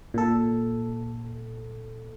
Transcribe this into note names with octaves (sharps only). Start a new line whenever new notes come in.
A#2 A4